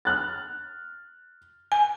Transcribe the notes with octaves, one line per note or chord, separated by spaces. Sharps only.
F6 F#6 A6
G#5